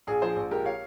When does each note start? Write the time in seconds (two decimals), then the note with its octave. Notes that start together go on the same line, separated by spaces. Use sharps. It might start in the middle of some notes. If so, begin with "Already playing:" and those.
0.07 A#1 G#4
0.22 F3 G#4 C5
0.36 A#1
0.51 G#3 G4 A#4
0.65 C#5 F5